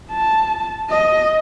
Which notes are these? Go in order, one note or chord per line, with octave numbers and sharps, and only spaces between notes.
A5
D#5